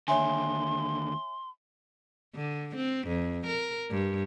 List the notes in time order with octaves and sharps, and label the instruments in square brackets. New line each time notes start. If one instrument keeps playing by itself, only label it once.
[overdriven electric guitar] D#2 D3 [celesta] C#5 E5 G#5 [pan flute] C6
[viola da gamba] D3
C4
F2
A#4
G2